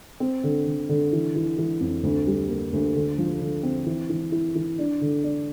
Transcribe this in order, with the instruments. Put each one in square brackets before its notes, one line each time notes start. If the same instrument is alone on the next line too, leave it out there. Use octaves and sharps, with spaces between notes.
[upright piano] C4
D3
D3
D3
E3
E3
E3
F2
D2
G3
A#3
D2
D3
F3
D3
C4
E3
E3
E4
E3
D4
D3
D4